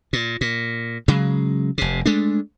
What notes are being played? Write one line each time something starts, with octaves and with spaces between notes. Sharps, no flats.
A#2
A#2
C#3 F#3 G#3
F1 C3
G#3 A3 D4